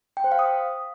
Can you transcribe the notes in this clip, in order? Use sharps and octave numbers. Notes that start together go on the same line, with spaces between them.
G5
C5
F5
D#6